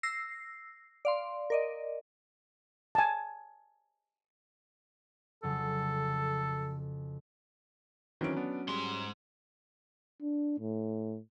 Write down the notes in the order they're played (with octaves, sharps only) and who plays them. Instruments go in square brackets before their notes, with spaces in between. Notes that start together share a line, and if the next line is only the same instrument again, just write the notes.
[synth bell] E6 A#6 C7
D5 F5 C6
A#4 D5 D#5
[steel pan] G#5 A5
[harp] F2 C#3 F#3 [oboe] A4
[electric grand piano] D#3 E3 C4 [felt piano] F#3 C#4 D7
[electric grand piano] B3 D4
[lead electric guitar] G#2 C6 [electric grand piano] G3 G#3
[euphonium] D4
A2